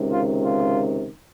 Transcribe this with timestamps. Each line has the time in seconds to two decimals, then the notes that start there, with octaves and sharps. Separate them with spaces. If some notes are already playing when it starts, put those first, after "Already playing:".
Already playing: C#2 C3 D#3
0.12 F4
0.45 F4